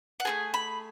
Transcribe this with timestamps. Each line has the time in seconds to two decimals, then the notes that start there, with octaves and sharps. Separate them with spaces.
0.20 F#5
0.25 A3 F4 G#4 G#5
0.54 B5